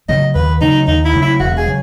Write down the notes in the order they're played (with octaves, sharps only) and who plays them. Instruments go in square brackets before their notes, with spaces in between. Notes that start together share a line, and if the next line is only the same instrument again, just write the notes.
[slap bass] C#3 F#3 A3 [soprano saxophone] D#5
[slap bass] D#2 [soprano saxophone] B4
[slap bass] C#3 F#3 A3 [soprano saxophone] D#4
[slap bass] D#2 [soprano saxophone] D#4
[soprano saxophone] E4
[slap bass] C#3 F#3 A3
[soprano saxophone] E4
[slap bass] E1 [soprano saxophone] F#4
[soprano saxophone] G#4
[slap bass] C#3 F#3